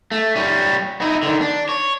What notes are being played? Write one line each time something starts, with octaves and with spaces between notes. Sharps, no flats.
A3
G3 C#4
D#4 E4
D3 D#3
D4
C#5